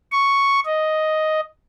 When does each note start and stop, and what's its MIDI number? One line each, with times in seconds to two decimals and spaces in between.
0.11 0.60 85
0.65 1.40 75